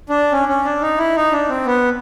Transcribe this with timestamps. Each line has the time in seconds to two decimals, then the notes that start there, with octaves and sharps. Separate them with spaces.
0.09 D4
0.32 C#4
0.48 C#4
0.65 D4
0.81 D#4
0.98 E4
1.16 D#4
1.32 D4
1.49 C4
1.66 B3